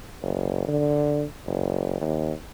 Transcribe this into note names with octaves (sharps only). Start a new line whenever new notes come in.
F#1
D3
F#1
D#2